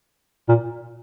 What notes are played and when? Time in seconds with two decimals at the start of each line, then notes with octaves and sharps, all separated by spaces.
0.49 A#2